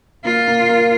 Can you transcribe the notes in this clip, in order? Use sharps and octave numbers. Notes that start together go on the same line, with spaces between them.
A#3 F4
A#3
A#3